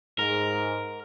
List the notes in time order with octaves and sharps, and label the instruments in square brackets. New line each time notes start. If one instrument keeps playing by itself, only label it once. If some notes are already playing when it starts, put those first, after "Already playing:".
[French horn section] G#2 [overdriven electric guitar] A#4